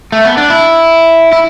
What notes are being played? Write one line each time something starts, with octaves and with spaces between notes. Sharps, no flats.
A3
B3
D4
E4
E4